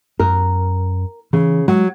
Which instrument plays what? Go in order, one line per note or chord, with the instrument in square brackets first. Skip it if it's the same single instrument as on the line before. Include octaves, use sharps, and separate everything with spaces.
[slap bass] F#2 [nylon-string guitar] A#4
[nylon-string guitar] C#3 [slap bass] E3
[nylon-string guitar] F#3 [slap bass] G#3